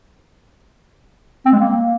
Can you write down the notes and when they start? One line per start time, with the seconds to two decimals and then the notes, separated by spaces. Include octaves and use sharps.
1.46 C4
1.52 G#3
1.59 A#3